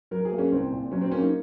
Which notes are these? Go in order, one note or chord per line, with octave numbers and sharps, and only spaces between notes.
F#3 A#4
G#4
A#3
C#4
C2 C4
A#2
F#3 C#4
C4
A#3 C#4
D#4